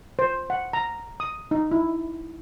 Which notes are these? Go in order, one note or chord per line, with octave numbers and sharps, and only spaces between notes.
C5
F#5
A#5
D#6
D#4
E4